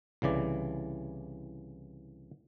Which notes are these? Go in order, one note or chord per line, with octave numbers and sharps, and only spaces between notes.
C2 C#3 E3 D5